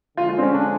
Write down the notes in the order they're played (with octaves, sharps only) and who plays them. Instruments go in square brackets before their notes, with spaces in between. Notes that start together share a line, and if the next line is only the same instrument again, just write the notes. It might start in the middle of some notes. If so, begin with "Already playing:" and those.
[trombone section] D3 F3 G#3 [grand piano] F4
[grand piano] F4
C4
C#4
D4